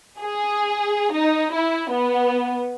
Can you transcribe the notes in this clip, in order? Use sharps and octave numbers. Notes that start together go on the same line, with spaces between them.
G#4
D#4
E4
B3